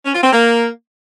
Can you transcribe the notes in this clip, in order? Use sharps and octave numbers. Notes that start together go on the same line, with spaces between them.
C#4
F4
C4
A#3